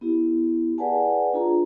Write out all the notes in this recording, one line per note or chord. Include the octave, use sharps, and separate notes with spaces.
B3 E4 G4
G#4 B4 D5 F#5 G#5 A5
D4 F4 G#4 A#5